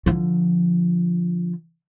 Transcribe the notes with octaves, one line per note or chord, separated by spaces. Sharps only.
D3 F3